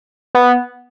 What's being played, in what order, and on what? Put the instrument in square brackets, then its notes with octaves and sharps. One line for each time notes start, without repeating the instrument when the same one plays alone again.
[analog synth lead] B3